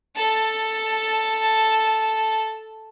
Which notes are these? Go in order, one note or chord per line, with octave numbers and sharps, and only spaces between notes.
A4 A5